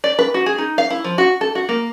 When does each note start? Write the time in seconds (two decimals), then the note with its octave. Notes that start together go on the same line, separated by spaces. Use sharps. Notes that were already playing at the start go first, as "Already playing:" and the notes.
0.04 D5
0.19 B4
0.34 F#4
0.46 G#4
0.58 D#4
0.78 F5
0.90 E4
1.04 F3
1.18 F#4
1.41 A4
1.55 F#4
1.69 A#3